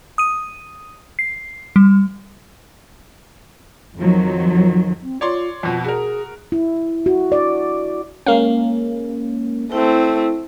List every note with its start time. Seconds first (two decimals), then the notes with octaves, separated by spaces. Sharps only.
0.18 D#6 D#7
1.19 C7
1.76 G3
3.97 F2 D#3 F3 F#3
5.03 C4
5.21 F4 C#5 D5 C6
5.63 F2 B2 F4
5.84 F#4 G#4 A#4
6.52 E4
7.06 F#4
7.32 D5
8.26 G#3 A#3 C#4 F5
9.72 A3 C4 E4